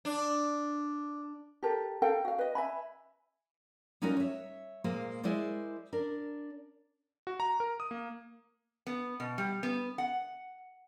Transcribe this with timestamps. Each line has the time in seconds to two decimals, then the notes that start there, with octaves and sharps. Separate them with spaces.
0.05 D4
1.63 G4 A4 A#4
2.02 A4 A#4 F5 G5
2.25 F#4 F5
2.39 B4 D#5
2.55 E5 G#5 B5
4.02 G3 C#4 D#4 F4 F#4 A#4
4.17 C#5 E5
4.84 A#2 G#3 A#3 C5
5.23 G#3 E4 A#4 C5 D5
5.92 D4 A#4 D5
7.27 F#4
7.40 A#5
7.60 A#4
7.80 D#6
7.91 A#3
8.87 B3
9.20 B2
9.38 G3
9.63 B3
9.98 F#5